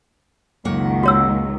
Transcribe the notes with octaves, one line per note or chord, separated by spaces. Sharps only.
C#2 F#2 D#3 A#3 F#5
F#4 C#5 E6